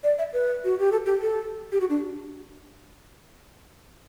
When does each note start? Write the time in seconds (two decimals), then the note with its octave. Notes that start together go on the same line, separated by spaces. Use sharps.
0.04 D5
0.18 E5
0.33 B4
0.65 F#4
0.79 G4
0.92 A4
1.06 G4
1.21 A4
1.72 G4
1.80 F#4
1.90 D4